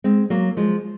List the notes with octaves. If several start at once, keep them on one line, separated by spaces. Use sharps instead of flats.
G#3 C4
F#3 A#3
F3 G#3